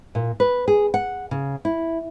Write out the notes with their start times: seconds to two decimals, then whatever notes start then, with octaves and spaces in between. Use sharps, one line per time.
0.15 A#2
0.40 B4
0.68 G#4
0.94 F#5
1.31 C#3
1.65 E4